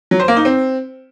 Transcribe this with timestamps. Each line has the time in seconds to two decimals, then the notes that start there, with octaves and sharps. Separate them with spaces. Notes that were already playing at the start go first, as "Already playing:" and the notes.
0.11 F#3
0.20 C5
0.28 A#3
0.37 D#4
0.45 C4